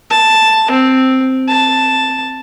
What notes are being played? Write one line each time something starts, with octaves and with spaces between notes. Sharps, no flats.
A5
C4
A5